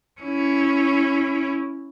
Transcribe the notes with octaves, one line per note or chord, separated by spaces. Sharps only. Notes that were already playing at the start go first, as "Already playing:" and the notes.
C#4 E4